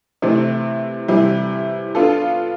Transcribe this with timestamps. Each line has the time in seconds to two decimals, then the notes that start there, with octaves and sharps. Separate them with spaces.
0.22 C3 E3 A3 C4
1.08 C3 E3 G3
1.95 B3 D4 F4 A4